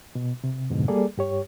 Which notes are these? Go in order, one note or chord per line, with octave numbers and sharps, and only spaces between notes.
B2
C3
F2 G#2 B2 D3
G3 A#3 G#4 A4 D5
G2 G4 C#5